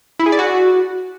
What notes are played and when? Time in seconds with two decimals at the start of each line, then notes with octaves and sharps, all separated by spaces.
0.19 E4
0.26 G#4
0.32 D5
0.39 F#4